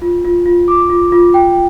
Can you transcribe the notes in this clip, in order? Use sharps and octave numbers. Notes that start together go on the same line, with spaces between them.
F4
F4
F4
D6
F4
F4
G5